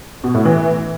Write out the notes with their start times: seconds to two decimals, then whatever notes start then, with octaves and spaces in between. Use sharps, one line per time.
0.24 B2
0.34 A2
0.45 E3